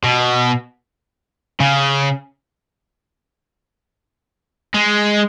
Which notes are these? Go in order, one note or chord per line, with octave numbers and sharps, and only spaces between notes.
B2
C#3
G#3